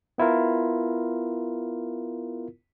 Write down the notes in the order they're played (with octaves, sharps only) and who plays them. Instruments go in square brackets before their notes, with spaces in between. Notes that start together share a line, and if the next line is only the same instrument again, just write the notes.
[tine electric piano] B3 E4 F4 A#4